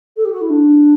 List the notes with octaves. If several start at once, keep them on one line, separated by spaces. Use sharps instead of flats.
A4
G4
F#4
E4
D4